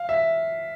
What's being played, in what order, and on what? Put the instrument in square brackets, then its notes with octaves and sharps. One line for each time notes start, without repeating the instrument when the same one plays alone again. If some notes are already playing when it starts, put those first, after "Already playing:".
Already playing: [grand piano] F5
E5